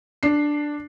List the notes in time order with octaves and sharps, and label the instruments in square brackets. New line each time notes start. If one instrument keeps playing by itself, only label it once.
[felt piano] D4 C7